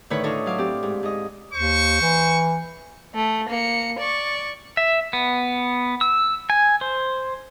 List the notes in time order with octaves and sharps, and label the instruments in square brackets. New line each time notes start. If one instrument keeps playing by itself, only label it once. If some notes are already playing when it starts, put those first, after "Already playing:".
[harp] A2 D3 D#3 B4 C#5 B5
D4 D#4 F4 A4 C#5 D#5
F#3 F5 D6
C4 G4 D5
G#2
G#2 D#5
[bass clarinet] D#2 [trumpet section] C5 C#6
[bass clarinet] E3
[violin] A3
A#3 C#7
D5 C#6
[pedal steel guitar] E5
B3
E6
G#5
C5